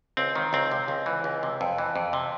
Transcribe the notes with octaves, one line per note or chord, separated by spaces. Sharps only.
C#2 C4
D#3
C#2 C4
C3
C#2
E3
C#2
C3
F2
E3
F2
C3